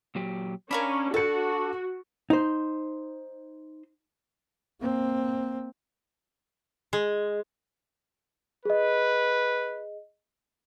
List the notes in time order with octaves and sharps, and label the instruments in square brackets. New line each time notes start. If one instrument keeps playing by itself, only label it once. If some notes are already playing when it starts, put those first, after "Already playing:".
[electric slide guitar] A#2 F#3 G4
[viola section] C#4 [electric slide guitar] D4 [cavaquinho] A#4 F5 B5
[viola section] F#4 [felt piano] A4 C#7 [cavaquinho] A5
[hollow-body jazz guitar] D#4 C5
[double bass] A#3 C4
[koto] G#3
[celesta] G#4 D#5 [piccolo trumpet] B4